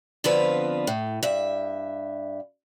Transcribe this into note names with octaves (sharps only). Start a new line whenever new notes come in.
D3 F3 B3 C4 F4 B4
A2
G2 E5